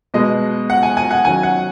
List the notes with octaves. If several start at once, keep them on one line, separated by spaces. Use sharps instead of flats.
B2 G#3 B3 D#5
F#5
G#5
G#5
F#5
D#3 F#3 C#4 G#5
F#5